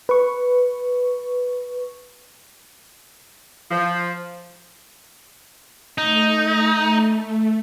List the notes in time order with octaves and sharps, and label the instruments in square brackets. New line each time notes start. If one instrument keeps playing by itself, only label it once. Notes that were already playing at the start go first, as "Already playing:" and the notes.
[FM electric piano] B4 C#6
[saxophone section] F3
[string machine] A3 [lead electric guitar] D#4